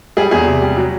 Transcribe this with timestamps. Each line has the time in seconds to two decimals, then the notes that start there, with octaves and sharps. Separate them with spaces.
0.17 G3 G#4
0.31 E2 G#4
0.47 C3
0.62 G3
0.77 F#3